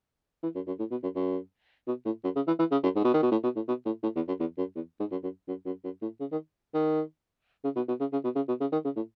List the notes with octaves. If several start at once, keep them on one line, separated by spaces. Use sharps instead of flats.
E3
F#2
F#2
A2
B2
F#2
F#2
B2
A2
F#2
C#3
E3
E3
C#3
F#2
G#2
B2
D#3
B2
A2
B2
A2
B2
A2
A2
E2
F#2
E2
F#2
E2
G#2
F#2
F#2
F#2
F#2
F#2
A2
C#3
D#3
D#3
C#3
B2
B2
C#3
C#3
B2
C#3
B2
C#3
D#3
C#3
A2